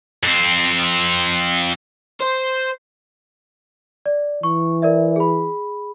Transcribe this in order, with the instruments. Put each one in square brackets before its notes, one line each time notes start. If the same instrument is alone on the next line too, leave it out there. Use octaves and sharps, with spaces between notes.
[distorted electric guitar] F2 C4
[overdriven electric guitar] C5
[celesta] D5
[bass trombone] E3 [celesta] C#6
[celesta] A#4 D5 E5
G#4 B5